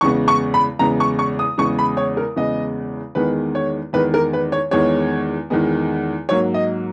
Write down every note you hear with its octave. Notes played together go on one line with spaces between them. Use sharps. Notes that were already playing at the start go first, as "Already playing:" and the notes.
E2 C#3 G#3 B3 C#6
C#6
B5
E2 C#3 G#3 B3 A#5
C#6
C#6
D#6
E2 C#3 G#3 B3 C#6
B5
C#5
A#4
E2 C#3 G#3 B3 D#5
E2 D#3 G#3 B3 B4
C#5
E2 D#3 G#3 B3 B4
A#4
B4
C#5
E2 D#3 G#3 B3 C#5
E2 D#3 G#3 B3
G#2 F#3 A#3 C#5
D#5